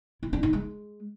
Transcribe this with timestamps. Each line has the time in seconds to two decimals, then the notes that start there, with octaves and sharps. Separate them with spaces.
0.23 E4
0.33 D4
0.43 D#4
0.53 G#3